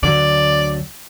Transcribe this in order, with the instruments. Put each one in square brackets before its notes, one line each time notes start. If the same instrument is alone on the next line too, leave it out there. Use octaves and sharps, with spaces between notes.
[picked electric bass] D2 D3 F#3 [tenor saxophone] D5